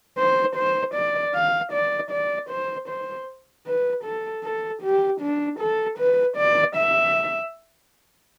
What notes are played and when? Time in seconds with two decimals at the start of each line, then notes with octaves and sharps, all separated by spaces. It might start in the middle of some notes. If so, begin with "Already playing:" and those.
0.18 C5
0.56 C5
0.95 D5
1.34 F5
1.73 D5
2.11 D5
2.50 C5
2.89 C5
3.67 B4
4.04 A4
4.44 A4
4.83 G4
5.21 D4
5.60 A4
5.99 B4
6.37 D5
6.76 E5